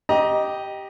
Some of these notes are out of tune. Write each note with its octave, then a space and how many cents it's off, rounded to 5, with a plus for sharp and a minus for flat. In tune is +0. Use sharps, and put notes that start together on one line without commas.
G4 -5 D#5 +0 A#5 +25